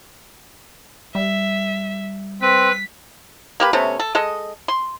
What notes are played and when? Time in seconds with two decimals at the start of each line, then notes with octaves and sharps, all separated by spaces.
1.15 G3 E5
2.42 C4 B4 B6
3.60 A#3 G4 B4
3.73 C3 A3 B3 C#4
3.99 A4
4.15 G#3 A4 D#5
4.68 C6